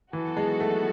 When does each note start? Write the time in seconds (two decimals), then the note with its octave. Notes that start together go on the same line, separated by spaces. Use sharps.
0.13 D#3 E3 F#3 B3 F#4 A4
0.37 G#3
0.60 A3